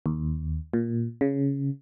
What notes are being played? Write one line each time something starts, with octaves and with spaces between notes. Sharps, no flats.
D#2
A#2
C#3